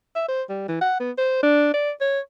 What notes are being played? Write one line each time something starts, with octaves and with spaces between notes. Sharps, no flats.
E5
C5
G3
E3
F#5
B3
C5
D4
D5
C#5